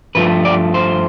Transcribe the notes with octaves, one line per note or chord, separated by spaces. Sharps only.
G2 F3 A3 B4
D5
C5